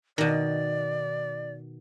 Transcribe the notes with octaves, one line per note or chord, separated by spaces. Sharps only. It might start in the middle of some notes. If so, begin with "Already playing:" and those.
B2 D#3 D5